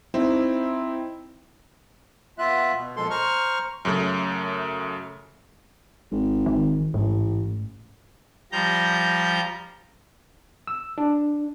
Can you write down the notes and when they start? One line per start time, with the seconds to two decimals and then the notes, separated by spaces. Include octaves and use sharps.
0.14 C4 D#4 E4
2.38 B3 F4 E5 F#6
2.75 B2
2.96 A#2 F3 G#3 A4 C6
3.10 C5 A#5 C#6 F6
3.85 F#2 C#3 A3
6.11 G#1
6.46 D#3
6.94 A1 G#2
8.52 F3 G3 A#5 G6
10.67 E6
10.98 D4